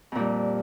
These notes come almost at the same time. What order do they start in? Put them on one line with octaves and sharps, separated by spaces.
F2 A#2 G3